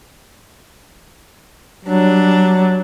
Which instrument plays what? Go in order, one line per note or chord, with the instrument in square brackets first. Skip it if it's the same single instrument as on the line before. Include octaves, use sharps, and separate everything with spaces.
[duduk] F#3 [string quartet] G3 D4